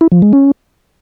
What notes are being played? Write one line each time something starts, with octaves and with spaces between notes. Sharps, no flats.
E4
F3
G#3
C#4